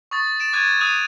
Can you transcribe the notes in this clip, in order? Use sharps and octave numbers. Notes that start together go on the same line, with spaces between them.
C#6 D#6 A6
A6 D7 E7
D6 F#6 G#6 A6 D#7
D#6 F#6 D#7 F7